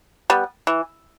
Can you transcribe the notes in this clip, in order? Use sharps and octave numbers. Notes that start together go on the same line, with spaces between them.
G3 B3
E3